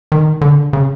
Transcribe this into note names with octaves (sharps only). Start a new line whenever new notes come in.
D#3
D3
C#3